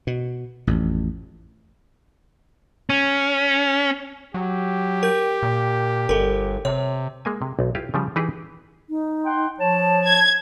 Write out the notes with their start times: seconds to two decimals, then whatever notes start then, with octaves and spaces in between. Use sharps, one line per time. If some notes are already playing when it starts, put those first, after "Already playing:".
0.07 B2
0.67 A1 F2
2.90 C#4
4.34 F#3 G4
5.03 A#4 G6
5.43 A#2
6.09 G1 A4 A#4
6.65 C3 C#5
7.25 G#3 A#3 G#5
7.42 C3
7.59 B1
7.75 E4 F4 G4 F5
7.94 C#3 F3 G3
8.16 E3 D#4 G4 G#4 B4 D#5
8.89 D#4
9.24 F#5 G5 C6
9.59 F3 C#5 A5
10.06 G#6